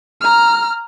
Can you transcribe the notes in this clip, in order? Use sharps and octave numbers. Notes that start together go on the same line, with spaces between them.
A#5 F6